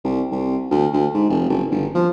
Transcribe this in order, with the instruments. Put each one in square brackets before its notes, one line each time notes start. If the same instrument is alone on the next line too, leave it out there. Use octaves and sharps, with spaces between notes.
[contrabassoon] C2
C2
D2
D2
G#2
F1
F#1
G1
F3